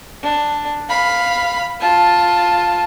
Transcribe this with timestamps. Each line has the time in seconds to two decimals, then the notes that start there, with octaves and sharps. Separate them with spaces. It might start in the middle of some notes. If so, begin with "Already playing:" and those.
0.23 D4
0.89 F5 B5
1.81 F4 A5